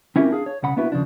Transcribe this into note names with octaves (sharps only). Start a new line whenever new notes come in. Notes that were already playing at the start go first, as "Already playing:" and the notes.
C4 C#4 E4 F4 G4 A#4
D4 G#4 F5
C#5
C2 C#3 F#5 B5
A#3 B3 D4 E4 F#4 B4
D#2 C#3 F3 D4